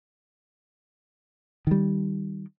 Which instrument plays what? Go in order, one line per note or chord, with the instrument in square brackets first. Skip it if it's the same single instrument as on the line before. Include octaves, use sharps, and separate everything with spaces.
[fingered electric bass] D#3 G3